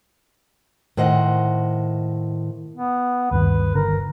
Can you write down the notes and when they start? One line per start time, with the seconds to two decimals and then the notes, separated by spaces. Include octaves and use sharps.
0.97 A2 D#3 C5 D#5 F#5
2.77 B3
3.31 D2 G2 D#3 B4
3.75 G1 D3 D#3 A#4